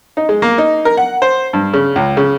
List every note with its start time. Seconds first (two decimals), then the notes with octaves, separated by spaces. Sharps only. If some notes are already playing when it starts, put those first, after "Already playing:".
0.17 D#4
0.29 G#3
0.42 A#3
0.58 D#4
0.85 A#4
0.97 F#5
1.22 C5
1.53 G2
1.73 C#3
1.96 C#2
2.17 C#3